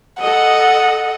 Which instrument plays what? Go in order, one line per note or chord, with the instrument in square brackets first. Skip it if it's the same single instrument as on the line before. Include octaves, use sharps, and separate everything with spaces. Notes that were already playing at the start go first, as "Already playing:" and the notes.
[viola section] A4 D#5 [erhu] F#5